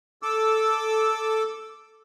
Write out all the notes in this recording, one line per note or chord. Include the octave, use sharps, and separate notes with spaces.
A4 D6 E6